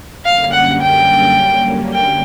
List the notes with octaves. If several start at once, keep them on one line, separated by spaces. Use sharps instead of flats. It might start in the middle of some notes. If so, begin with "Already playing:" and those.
F#2 D3 G3 A#3 C#4 F5
F#5
G5
G5